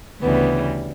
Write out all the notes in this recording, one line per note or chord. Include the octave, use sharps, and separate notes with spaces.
D2 C#3 E3 G3 B3